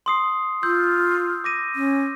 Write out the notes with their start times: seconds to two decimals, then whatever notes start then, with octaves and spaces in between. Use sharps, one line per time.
0.06 C6 D#6 C7
0.63 F4 C6 E6 G6
1.44 D6 A#6 D#7
1.75 C#4